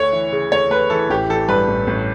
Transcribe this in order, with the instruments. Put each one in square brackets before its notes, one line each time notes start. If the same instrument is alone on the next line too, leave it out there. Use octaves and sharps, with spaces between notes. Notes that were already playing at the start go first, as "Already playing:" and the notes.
Already playing: [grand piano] D2 C#5
E3
C#3
D2 C#5
D2 B4
E3 A4
A1 G4
E3 A4
G2 B4
A1
A1